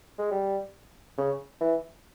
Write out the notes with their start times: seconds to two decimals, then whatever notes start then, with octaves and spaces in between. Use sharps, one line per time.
0.19 G#3
0.31 G3
1.18 C#3
1.61 E3